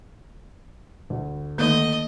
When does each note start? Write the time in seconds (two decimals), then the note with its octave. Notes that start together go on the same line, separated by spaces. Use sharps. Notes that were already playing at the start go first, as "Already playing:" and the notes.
1.10 D2
1.58 D#3 A3 A#3 D#4 D#5